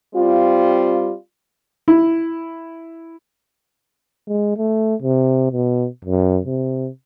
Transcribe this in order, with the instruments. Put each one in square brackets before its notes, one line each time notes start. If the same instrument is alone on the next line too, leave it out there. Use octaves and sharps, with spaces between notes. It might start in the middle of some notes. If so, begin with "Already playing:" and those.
[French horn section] G3 C4 F4
[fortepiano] E4
[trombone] G#3
A3
C3
B2
F#2
C3